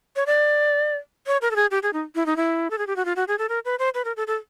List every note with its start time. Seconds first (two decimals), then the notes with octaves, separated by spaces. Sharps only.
0.16 C#5
0.27 D5
1.27 C#5
1.42 A#4
1.51 A4
1.56 G#4
1.71 G4
1.83 G#4
1.93 D#4
2.15 E4
2.26 D#4
2.37 E4
2.70 A4
2.78 G#4
2.87 G4
2.96 F#4
3.05 F4
3.16 F#4
3.28 G#4
3.38 A4
3.49 A#4
3.65 B4
3.79 C5
3.94 B4
4.05 A#4
4.17 A4
4.27 A4